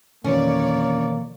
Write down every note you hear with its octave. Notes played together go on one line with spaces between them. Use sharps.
F2 B2 D#3 E3 A#3 C#4 C#5 D5